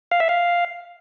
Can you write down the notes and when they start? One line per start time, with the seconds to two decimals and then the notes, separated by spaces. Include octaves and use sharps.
0.11 F5
0.20 E5
0.29 F5